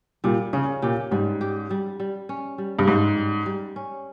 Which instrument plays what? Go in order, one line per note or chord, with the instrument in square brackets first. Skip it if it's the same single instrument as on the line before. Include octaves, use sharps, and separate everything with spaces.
[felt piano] A#2 [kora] G3
[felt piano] C#3 [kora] C#4
[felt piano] A#2 [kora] G4
[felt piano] G#2 [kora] G3
[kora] G4
G3
G3
C#4
G3
[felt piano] G2
[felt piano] G#2 [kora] G4
[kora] G3
G3
C#4